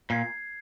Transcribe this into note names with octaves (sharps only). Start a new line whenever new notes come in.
A#2 G#6 C7